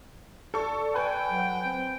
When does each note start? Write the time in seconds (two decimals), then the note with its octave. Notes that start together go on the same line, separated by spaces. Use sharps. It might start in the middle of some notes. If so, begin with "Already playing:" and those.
0.54 A4 D5 C#6
0.95 B4 G5 G#5
1.29 F#3
1.63 C4